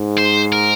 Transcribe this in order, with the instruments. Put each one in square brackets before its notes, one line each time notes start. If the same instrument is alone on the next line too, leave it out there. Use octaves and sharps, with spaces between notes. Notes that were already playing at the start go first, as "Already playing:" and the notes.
Already playing: [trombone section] G#2
[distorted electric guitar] C5
A#4